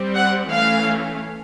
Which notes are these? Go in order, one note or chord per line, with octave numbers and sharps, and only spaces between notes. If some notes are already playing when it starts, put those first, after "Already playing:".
Already playing: G3 C4
F#5
E3 A3 C#4 F5